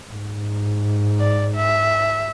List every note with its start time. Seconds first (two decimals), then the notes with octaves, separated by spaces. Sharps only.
0.11 G#2
1.20 D5
1.56 E5